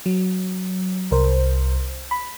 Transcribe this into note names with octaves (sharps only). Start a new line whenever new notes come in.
F#3
C2 A#4 C5
B5